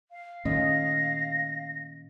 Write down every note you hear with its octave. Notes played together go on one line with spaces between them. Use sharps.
F5
A#2 D#3 A3 C#4 D#5 A#6